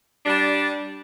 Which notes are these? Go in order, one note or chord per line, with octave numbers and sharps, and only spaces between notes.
G3 D4